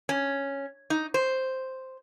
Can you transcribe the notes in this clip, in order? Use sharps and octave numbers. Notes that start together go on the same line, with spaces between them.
C#4
D#4
C5